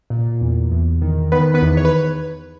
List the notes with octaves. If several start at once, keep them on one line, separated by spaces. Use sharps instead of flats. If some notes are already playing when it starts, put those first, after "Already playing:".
A#2
E2
E2
D#3
D#3 B3 B4
B3 B4
E2
C#5
B4